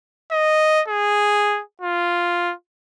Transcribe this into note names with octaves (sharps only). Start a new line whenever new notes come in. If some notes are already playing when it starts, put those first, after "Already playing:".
D#5
G#4
F4